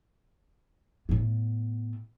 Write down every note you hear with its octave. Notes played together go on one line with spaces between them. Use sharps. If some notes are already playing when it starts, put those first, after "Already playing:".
A2 B3